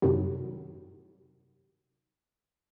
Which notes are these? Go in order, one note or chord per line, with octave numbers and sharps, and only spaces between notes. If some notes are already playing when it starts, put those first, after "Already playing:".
F#2 A2 C3 D#3 F#3 G3